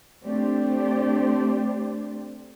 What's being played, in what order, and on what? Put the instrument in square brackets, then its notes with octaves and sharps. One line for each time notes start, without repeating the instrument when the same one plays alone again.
[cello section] A3 C4 D4 G4 C5 D5